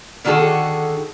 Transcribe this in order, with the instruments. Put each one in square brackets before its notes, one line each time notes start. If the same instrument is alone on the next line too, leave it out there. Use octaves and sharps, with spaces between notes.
[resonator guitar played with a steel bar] D3 D#3 F#4 G#4 A4